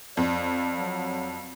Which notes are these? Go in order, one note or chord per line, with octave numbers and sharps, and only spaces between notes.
F2 D5
F#3